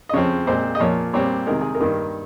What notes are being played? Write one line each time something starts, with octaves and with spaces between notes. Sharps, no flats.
D#5
C#3 F3 C4 C#5
A#2 G#3 C4 C5
D#5
A#2 F3 A#3 C#5
A#2 G3 C4 C#5
C3 D#3 G#3 A#4
G#4
A#4
G2 D#3 A#3